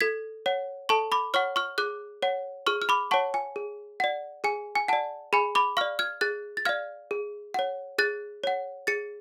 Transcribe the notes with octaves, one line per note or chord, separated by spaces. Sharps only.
A4 G#6 B6
C#5 F#5
A4 A5 C#6
B5 D6
C#5 F#5 C#6 F6
C#6 F6
G#4 D6 F#6
C#5 F#5
G#4 C#6 F6
F6
B5 D6
C#5 F#5 A5 C#6
G#5
G#4
D5 F#5
G#4 G#5
G#5
D5 F#5 A5
G#4 G#5 B5
B5 D6
D5 F5 C#6 F6
F6 G#6
G#4 F#6 A6
A6
D5 F5 F6 G#6
G#4
C#5 F#5
G#4 F#6 A6
C#5 F#5
G#4 A6 C#7